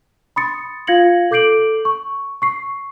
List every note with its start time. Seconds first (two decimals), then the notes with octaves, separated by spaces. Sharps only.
0.36 B5 C6 D#6 A6 C#7
0.87 F4 F5 G#6 A#6 C#7 F#7
1.31 A4 D6 G6 C7 D7 F#7
1.85 C#6
2.42 C#6 C7